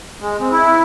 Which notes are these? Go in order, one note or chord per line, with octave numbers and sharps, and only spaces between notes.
G#3
C4
E4